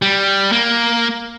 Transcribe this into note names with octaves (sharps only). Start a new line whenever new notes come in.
G3
A#3